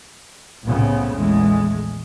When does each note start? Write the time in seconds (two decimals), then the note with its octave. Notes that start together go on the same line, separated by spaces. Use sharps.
0.64 C2 A2 C#3 B3 C4
1.12 A#1 E2 G#3 A3